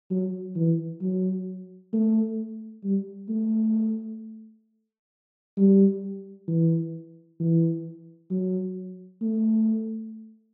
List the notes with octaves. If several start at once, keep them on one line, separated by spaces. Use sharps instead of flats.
F#3
E3
F#3
A3
G3
A3
G3
E3
E3
F#3
A3